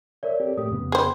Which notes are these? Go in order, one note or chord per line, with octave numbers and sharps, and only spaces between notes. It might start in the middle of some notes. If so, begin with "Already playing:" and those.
A#4 C#5 D5 E5
C4 G4 A4
A2 A3 G4 D#6
F2 C#3 B3
G#4 C5 G5 B5 C6